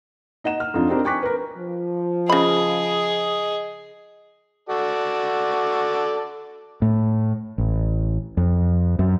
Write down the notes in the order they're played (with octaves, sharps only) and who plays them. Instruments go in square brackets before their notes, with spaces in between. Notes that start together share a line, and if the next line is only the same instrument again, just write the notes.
[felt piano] D#4 D#5 F#5 E7
F6
F2 D4 D#4 F4
C4 D4 D#4 G4 A#4
G5 G#5 C#6 D6 F#6 B6
A#4 B4
[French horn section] F3
[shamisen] C#3 B5 [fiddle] G#4 [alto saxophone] D#5
[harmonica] F#4 A4 D5
[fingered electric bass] A2
A1
F2
F#2